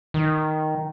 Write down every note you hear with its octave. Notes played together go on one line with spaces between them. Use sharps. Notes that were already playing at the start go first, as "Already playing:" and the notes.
D#3